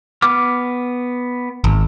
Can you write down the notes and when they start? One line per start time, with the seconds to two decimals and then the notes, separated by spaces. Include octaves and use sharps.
0.22 B3 D6 F6
1.64 G#1